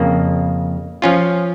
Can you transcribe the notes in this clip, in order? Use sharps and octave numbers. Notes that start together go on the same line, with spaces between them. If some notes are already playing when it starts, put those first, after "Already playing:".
Already playing: F2 C#3 A#3
F3 C#4 F4